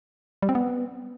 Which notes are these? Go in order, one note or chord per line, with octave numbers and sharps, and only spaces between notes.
G3
C4
B3